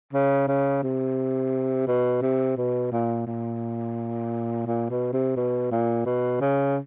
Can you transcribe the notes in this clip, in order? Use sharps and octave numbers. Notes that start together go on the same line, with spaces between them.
C#3
C#3
C3
B2
C3
B2
A#2
A#2
A#2
B2
C3
B2
A#2
B2
C#3